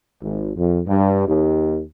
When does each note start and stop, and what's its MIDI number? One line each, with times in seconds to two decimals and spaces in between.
0.22 0.52 32
0.57 0.80 41
0.87 1.23 43
1.27 1.82 39